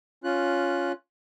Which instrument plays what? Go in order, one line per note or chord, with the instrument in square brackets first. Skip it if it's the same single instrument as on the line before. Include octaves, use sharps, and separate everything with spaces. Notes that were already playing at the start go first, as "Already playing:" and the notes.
[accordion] C#4 F4 F#6